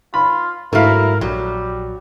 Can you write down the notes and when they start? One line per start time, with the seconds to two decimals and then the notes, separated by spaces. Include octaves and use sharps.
0.14 F4 B5
0.73 G#2 F#3 A3 E4 A#4 F5
1.21 A#1 F#3 G3